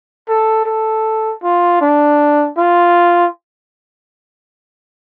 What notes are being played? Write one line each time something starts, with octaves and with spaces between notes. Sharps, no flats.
A4
A4
F4
D4
F4